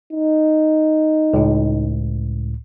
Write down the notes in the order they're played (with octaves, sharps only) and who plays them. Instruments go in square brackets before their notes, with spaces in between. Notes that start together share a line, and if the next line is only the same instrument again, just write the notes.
[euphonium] D#4
[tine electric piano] C#2 A2